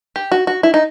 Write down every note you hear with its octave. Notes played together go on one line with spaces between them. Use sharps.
G4
F#4
F#4
E4
D#4